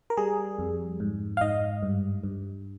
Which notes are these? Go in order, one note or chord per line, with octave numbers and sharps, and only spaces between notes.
A#4
G3 G#4
F2
G#2
F5
G#2 D#5
G2
G2